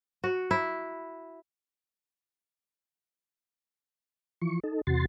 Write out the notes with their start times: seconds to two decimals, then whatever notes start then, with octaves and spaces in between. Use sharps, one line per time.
0.24 F#4
0.51 E4
4.42 E3 F3 C#6
4.64 D#4 A4
4.87 E2 C3 F#4 C6 A6